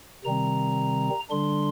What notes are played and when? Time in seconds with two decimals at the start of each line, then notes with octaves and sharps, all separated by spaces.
0.24 C3 D#3 G3 C4 A#5
1.30 D3 G3 D4 C6